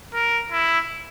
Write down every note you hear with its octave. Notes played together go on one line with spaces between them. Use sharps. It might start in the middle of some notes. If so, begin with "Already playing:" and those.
A#4
E4